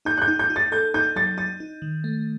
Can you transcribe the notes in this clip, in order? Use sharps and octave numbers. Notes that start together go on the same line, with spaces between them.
D#4 G6
F#6
G6
D#4
G6
D#4
A6
A4 G6
D#4 G6
F#3 A6
D#4 A6
D#4
D#3
A3